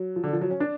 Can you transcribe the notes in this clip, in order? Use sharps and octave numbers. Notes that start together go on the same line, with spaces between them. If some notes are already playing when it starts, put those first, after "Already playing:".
Already playing: F#3
F3
D3
F3
F#3
C#4
D4